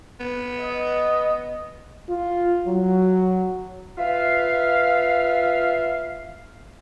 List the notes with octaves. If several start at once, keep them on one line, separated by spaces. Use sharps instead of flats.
B3
D#5
F4
F#3
F4 B4 E5 F5